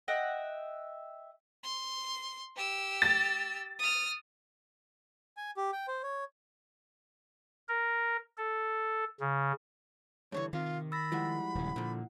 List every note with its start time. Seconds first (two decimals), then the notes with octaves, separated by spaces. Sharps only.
0.08 D#5 E5 F#5 G5
1.64 C6
2.56 G4 E6
3.02 A6
3.79 D#6 F6
5.37 G#5
5.57 G4
5.72 G5
5.88 C5
6.03 C#5
7.68 A#4
8.38 A4
9.20 C#3
10.32 G2 D3 E3 C#5
10.53 C3 D#3 F4
10.92 B5 E6 A6 A#6
11.12 F3 G3 G#3 E4 F#5
11.55 D#1 C#3
11.76 A#2 D3 F3